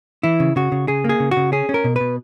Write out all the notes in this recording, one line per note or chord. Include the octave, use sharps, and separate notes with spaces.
E3 E4
C#3
C#3 F#4
C#3
C#3 G#4
A#3 G#4
C#3
F#4
C#3
C#4 G#4
C#4
A#4
B2
B2 B4